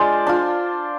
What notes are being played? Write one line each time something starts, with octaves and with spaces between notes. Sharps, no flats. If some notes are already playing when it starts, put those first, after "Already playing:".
Already playing: G#3 D4 F4 C5 D5
D4 F4